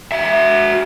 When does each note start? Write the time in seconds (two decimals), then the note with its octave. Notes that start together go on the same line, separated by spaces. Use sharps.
0.12 F#4 E5